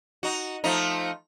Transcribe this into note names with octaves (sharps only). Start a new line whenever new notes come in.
D#4 F#4
F3 A3 D#4